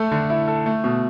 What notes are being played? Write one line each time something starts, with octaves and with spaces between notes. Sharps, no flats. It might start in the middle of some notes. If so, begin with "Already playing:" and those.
Already playing: A3 A4
D3
E4
A4
A3
B2